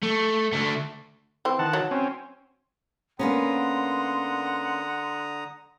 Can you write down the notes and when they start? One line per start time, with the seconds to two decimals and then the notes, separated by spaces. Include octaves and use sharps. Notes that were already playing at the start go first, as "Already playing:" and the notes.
0.03 A3
0.53 D3 A3
1.45 E3 C4
1.59 D#3 F#5 A5
1.73 F#3
1.91 C4 C#4
3.19 D3 A#3 B3 C#4 F#5 A#5 C6 D#6